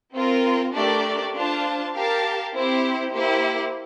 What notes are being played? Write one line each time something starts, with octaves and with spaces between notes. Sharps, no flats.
C4 F4 A#4
A3 D4 G4 A#4 D5
D4 F4 C5 F5 A5
G4 A#4 F5 A5
C4 E4 G4 C5
A#3 E4 G4 C5